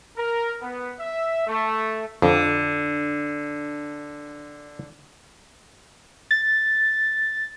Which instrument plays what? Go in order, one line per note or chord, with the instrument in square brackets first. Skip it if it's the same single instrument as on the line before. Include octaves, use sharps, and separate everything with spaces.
[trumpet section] A#4
B3
E5
A3
[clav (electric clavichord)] F2 [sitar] D3
[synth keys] A6